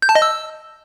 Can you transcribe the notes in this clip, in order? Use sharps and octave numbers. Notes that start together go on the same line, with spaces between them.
G6
A5
D#5
E6